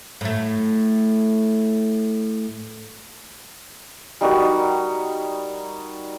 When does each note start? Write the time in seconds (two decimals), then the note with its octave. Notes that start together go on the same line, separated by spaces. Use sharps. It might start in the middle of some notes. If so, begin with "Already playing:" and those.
0.21 A2 A3
4.21 G3 D#4 F#4 A#4